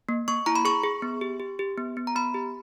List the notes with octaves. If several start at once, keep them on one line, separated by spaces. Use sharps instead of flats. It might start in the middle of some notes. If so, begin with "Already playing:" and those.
A#3
A#3 C#6
E4 A#5
B5
G#4 C#6
G#4
B3
G4
G4
G4
B3
B3
A#5
B3 B5
G4